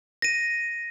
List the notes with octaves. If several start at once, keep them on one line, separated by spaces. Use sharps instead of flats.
A#6 D#7